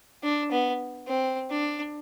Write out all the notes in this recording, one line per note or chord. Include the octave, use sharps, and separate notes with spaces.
D4
B3
C4
D4